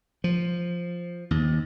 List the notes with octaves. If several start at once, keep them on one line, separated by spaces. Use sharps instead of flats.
F3
D#2